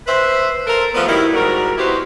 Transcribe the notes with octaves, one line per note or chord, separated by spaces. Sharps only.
B4 C5 E5
A4 A#4 C5
F3 G3 A3 B3
D#3 F#3 G3 E4
G#2 G3 F#4 A#4
B3 E4 F#4 G4 B4 C5